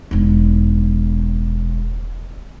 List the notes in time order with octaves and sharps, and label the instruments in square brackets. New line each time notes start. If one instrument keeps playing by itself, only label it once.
[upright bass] E1 D#4